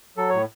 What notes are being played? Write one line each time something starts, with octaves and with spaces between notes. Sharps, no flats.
F#3 A4
A2 C#5